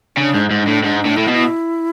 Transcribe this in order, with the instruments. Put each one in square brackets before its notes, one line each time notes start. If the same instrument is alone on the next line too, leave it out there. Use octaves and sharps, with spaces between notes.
[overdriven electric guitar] C#3 [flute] D4
[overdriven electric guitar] G#2
G#2
[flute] D4
[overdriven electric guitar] A2
[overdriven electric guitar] G#2 [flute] D4
[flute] D4
[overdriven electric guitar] A2
[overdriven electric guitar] A2 [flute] E4
[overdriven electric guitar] B2
[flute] E4